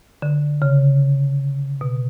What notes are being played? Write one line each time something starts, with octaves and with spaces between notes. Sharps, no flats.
D3
C#3
B2